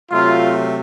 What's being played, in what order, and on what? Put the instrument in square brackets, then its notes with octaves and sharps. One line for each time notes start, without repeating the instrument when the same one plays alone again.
[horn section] C3 F#3 A3 F4